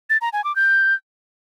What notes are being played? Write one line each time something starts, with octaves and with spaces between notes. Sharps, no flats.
A6
A#5
G#5
D6
G6